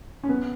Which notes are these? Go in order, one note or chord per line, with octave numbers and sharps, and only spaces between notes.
C#4
B3